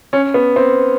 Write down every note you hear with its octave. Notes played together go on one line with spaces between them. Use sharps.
C#4
B3
C4